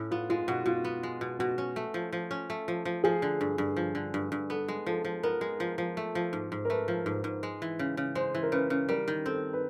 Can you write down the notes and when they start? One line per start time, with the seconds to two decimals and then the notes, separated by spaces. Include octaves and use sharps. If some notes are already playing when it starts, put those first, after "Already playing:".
Already playing: A2 C#4
0.11 B3 F4
0.30 G#3 F4
0.48 B2 F#4
0.66 B2 F4
0.85 B3
1.03 G#3
1.21 B2
1.39 B2 F#4
1.58 C#4
1.76 A3
1.94 F3
2.12 F3
2.31 C#4
2.50 A3
2.68 F3
2.85 F3
3.04 F3 G#4
3.22 D3
3.41 G2
3.58 G2
3.77 F3
3.95 D3
4.14 G2
4.32 G2
4.50 B3 A4
4.68 G#3
4.86 F3 A4
5.05 F3
5.23 B3 A#4
5.41 G#3
5.60 F3
5.78 F3
5.97 A3
6.15 F3
6.33 G#2
6.52 G#2
6.65 A#4
6.70 A3 B4
6.88 F3
7.06 G#2
7.24 G#2
7.43 G#3
7.62 E3
7.79 C#3
7.97 C#3
8.15 G#3 C5
8.35 E3
8.43 A#4
8.52 C#3 B4
8.70 C#3
8.89 G3 A#4
9.08 D#3
9.26 C4 A4
9.53 B4